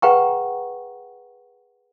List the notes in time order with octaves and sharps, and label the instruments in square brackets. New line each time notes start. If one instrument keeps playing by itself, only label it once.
[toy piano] G#4 B4 F#5 G5 A#5 C#6